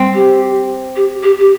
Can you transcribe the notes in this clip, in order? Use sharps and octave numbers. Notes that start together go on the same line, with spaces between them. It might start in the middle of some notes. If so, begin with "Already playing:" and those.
Already playing: C4
G4
G4
G4
G4